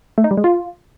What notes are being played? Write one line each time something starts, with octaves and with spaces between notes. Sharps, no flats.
A3
D#4
G3
G#3
F4